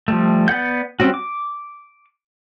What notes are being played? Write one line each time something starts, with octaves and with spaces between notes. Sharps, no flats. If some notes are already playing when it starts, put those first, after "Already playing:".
F3 G3 A3
B3 D5 F#5 G6
G3 C4 C#4 F#4
D6